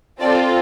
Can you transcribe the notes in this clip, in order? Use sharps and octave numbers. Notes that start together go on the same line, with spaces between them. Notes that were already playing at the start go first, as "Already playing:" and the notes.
C4 F4 A4 D5